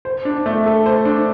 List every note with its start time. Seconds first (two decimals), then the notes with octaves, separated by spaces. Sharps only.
0.05 C5
0.25 D4
0.46 A3
0.66 A4
0.86 C5
1.05 D4